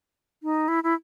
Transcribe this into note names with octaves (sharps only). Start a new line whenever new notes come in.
D#4
E4
E4